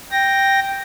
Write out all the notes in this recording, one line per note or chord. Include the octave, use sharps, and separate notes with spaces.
G5 A#6